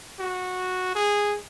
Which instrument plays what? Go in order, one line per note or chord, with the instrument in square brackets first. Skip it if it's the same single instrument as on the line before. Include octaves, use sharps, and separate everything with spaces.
[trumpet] F#4
G#4